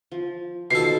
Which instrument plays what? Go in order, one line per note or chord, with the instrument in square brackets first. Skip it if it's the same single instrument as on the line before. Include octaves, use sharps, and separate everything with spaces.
[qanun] F3
[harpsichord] B2 A4 [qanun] D#3 F3 [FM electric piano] C7